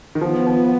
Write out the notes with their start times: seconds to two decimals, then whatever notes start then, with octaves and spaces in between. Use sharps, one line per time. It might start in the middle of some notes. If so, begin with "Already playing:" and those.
0.15 D#3
0.21 F3 B3
0.47 F3